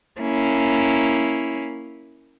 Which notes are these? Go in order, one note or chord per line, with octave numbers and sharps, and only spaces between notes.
A#3 C#4 E4